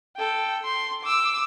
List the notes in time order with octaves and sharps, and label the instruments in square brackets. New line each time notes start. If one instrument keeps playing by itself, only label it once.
[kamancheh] A4 G5
C6
D6 E6